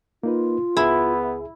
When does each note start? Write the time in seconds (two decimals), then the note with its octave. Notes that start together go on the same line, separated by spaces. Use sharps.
0.23 A#3 D#4 F4 B4
0.77 C#2 B3 E4 G#4